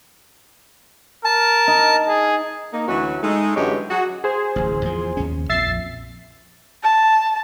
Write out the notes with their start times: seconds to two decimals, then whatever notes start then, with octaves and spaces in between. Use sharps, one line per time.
1.25 A#4 A5
1.68 D#4
2.08 G#4
2.73 A#3 D#4
2.87 D2 E3 F#3 C#4 F#4
3.22 G#3 A3 D#4
3.56 F#2 D3 E3 G#3 G4 C#5
3.90 F#3 F#4 G#4
4.24 G#4 C5
4.56 D1 A1
4.85 E2 F3
5.17 D#2 C#4
5.49 A#1 F2 E5 A6 C7
6.83 A5